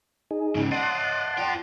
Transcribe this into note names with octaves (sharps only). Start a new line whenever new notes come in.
D#4 G#4
G#2 C#3
D5 D#5 F#5 A5 C6
F4 G5